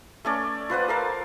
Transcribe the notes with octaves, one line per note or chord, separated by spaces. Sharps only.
A3 C#4 D5
F4 B4 C5 F#5
A4 A#4 F5